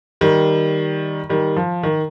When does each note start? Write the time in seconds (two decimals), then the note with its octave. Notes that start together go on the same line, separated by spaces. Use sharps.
0.21 D#3 G3
1.29 D#3 G3
1.56 F3
1.83 D#3